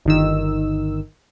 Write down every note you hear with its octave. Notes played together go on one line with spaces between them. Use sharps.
G1 D#3 E6